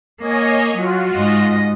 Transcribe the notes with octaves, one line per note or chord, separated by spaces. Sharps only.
A#3 C#5 D#5 G#5
F#3 F4 F#4
G#2 D#5